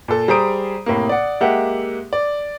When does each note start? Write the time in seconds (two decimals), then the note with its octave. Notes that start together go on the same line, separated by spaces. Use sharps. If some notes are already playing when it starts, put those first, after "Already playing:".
0.08 A#2 A4
0.28 G3 G#4 C5 A#5 D#6 D7
0.86 A2 C3 A#3
1.09 D5 F#5
1.40 G#3 A#3 G4 E5 F#5
2.13 D5